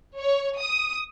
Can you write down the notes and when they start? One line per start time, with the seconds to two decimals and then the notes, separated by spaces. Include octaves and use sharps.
0.18 C#5
0.58 D#6